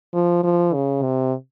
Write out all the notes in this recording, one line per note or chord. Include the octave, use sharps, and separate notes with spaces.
F3
F3
C#3
C3